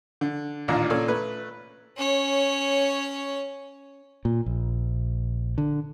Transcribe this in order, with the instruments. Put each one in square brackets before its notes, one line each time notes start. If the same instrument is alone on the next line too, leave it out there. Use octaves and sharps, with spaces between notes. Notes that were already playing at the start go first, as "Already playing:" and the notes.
[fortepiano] D3
A1 D#2 A#2 D4 A#5
A#2 C#4 A4 D5
A3 B4
[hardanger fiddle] C#4 C#5
[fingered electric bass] A#2
A#1
D3